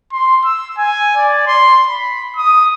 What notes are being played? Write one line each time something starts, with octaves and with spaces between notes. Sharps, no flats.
C6
E6
G#5
D5
C6
B5
D#6